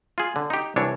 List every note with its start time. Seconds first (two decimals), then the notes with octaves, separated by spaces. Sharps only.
0.18 F4 G#4
0.36 D3
0.50 D#4 G4
0.76 C2 E3 D4 C#5